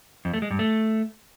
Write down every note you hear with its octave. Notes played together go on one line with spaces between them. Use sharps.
F2
A3
G#3
G2
A3